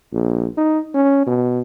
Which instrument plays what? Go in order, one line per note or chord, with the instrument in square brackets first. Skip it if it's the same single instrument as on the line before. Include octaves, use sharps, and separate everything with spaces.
[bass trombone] A#1
D#4
C#4
B2